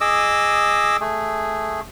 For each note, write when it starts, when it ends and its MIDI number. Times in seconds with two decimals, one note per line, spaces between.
0.01 0.97 68
0.01 0.97 75
0.01 0.97 86
0.01 0.97 88
1.00 1.81 57
1.00 1.81 68